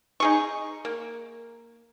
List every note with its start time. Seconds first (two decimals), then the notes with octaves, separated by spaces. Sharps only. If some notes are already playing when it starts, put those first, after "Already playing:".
0.20 D#4 G#4 C#6
0.85 A#3